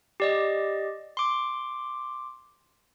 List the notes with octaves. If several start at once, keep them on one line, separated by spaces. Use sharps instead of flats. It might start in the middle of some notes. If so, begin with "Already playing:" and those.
G4 D5 D#5
C6 D6